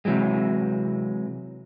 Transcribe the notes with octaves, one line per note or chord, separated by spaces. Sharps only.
C3 E3 F#3 G#3